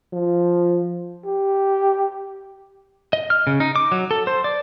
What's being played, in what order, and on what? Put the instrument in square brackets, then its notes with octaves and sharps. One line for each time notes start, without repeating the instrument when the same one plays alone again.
[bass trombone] F3
[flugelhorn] G4
[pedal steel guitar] D#5
F6
C#3
D#4
D6
F#3
A4
C5
D5